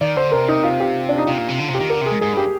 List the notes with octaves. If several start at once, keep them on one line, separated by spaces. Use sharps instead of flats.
D#3 D5
D3 C5
C3 A#4
D#4
F4
G4
D4
D#4
C3 F4
A#2
C3
D3
C3
G4
D#3
D3 A#4
C3 G#4
G#2
G#2 G#4
G2 G4